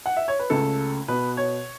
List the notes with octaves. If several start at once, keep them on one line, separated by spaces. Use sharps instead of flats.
F#5
E5
C#5
B4
C#2 C#3 A3 A4
B2 B3 B4
C#5